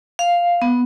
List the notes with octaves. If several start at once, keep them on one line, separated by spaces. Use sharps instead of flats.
F5
B3